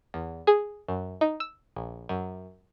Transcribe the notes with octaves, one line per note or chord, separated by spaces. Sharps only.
E2
G#4
F#2
D#4
E6
A#1
F#2